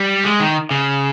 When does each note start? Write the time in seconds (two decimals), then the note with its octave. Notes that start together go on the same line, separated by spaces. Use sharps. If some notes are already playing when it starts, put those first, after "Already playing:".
Already playing: G3
0.25 G#3
0.40 D#3
0.71 C#3